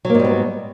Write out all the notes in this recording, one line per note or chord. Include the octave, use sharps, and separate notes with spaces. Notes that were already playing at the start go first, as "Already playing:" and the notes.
G#2 F#3 G3 A#3 B3